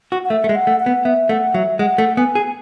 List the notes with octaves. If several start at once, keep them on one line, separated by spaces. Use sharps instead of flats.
F#4
F#5
A3 E5
A3
G#3
F#5
A3
F#5
B3
B3 E5
A3 F#5
F#3 E5
G#3 F#5
A3
B3 G#5
G#4